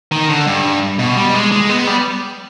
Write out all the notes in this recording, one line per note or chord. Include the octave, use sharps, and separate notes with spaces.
D#3
D3
G2
B2
G3
G#3
G#3
B3
G3